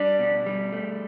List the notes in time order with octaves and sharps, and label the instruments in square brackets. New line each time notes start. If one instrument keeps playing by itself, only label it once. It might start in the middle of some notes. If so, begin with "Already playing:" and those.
Already playing: [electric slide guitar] G3 [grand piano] D4
[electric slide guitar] B2
G3
A3